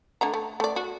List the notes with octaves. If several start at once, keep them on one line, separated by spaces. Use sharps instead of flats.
D3 A3 A#5
A3
A3 D5
F#4